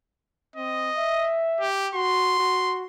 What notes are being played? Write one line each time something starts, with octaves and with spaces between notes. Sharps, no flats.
C4 D#5
E5
G4
F#4 C6
F#4